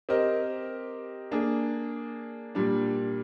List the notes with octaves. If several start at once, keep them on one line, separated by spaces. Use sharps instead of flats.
C4 G4 A#4 D#5
A#3 D4 G#4
A#2 G3 D4